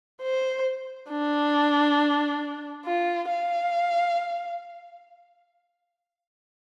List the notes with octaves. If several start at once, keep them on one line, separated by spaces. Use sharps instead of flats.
C5
D4
F4
F5